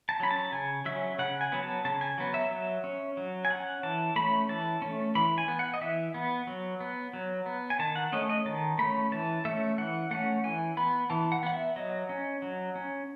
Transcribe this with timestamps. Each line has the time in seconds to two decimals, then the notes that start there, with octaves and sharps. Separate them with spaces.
0.09 A5
0.20 F#3 C#4 B5
0.31 A5
0.52 C#3 G#5
0.85 F#3 C#4 E5
1.19 C#3 F#5
1.41 G#5
1.52 F#3 B3
1.63 A5
1.85 C#3 A5
2.01 G#5
2.18 F#3 B3
2.34 E5
2.51 F#3
2.84 C#4
3.17 F#3
3.45 G#5
3.50 C#4 F#5
3.83 E3 A5
4.16 A3 C#4 B5
4.49 E3 A5
4.82 A3 C#4
5.15 E3 B5
5.38 G#5
5.48 B3
5.59 F#5
5.74 D#5
5.81 E3 E5
6.14 B3
6.47 F#3
6.80 B3
7.13 F#3
7.46 B3
7.70 G#5
7.79 D#3 A5
7.96 F#5
8.12 A3 C#4 D#5
8.29 D#5
8.46 D#3 A5
8.78 A3 C#4 B5
9.12 E3 A5
9.45 A3 C#4 E5
9.78 E3 F#5
10.11 A3 C#4 F#5
10.44 E3 G#5
10.77 B3 B5
11.10 E3 A5
11.32 F#5
11.43 B3 F#5
11.54 E5
11.76 F#3 D#5
12.09 C#4
12.42 F#3
12.76 C#4